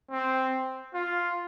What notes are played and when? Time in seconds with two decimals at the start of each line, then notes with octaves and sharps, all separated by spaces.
0.11 C4
0.94 F4